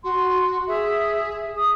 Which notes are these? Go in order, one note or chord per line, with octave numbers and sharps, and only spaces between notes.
F#4 C6
G#4 E5
D#6